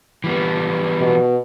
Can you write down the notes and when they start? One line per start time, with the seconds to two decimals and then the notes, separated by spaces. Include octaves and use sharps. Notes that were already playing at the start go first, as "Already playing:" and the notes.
0.24 E3 G3 B3
1.01 B2